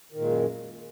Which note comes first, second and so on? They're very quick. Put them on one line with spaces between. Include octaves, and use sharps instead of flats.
D#3 A#2 G#3 F#2